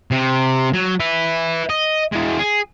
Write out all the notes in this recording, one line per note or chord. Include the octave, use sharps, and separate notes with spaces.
C3
F#3
B4 E5
D#5
E3 G#3
G#4